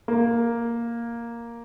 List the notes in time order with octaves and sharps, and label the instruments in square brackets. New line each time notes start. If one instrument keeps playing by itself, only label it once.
[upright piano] A#3